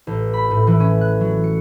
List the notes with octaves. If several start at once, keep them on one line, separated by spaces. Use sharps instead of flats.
A1
B5
A2
E3
C#4
F#6
F#3
C#7